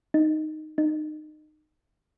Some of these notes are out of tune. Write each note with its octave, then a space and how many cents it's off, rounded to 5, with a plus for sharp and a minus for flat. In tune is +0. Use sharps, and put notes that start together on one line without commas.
D#4 -5
D#4 -25